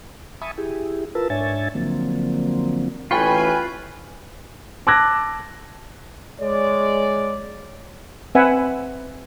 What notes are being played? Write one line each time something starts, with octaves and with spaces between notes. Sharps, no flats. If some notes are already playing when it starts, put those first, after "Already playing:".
E5 G#5 A5 B5 C#6 D#6
E4 G4 G#4
F4 A#4 B4 A5 E6
G#2 D4 C#5 E5 G#5 A6
D3 F3 F#3 A#3 C4
A1 F4 B4 G5 G#5 B5 C#6
A5 D6 E6 F#6 G#6 A#6
G#3 C#5 D5
C4 B4 E5 F#5 G#5